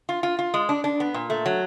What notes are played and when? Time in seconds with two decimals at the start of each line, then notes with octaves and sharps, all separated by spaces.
0.09 F4
0.23 F4
0.39 F4
0.54 G#3
0.69 D4
0.84 D4
1.00 B3
1.14 A#2
1.30 A3
1.46 F#3